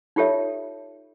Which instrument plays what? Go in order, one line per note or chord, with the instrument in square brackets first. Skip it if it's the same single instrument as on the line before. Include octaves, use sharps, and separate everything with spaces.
[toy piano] D#4 F4 G4 A4 C#5 E5